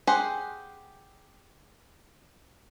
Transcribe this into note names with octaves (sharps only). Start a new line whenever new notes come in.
G4 G#4 C5 F#5